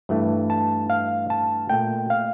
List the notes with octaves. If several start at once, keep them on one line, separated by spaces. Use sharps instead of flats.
G2 E3 A3
A5
F5
A5
A#2 A3 G5
F5